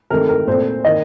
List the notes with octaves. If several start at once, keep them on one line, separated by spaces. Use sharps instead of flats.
C3 D#3 A3 A#4
A#4
A#2 A3 C4 C5
D#3 A#3 D#5